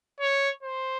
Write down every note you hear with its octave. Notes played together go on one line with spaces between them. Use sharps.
C#5
C5